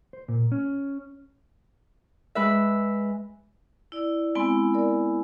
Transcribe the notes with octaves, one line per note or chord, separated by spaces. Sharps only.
C5
A#2
C#4
G#3 B4 E5
E4 D5
G#3 B3 C4 E4 G#5
A#4 D5